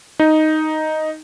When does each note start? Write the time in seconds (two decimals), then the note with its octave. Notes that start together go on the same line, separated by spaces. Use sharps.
0.20 D#4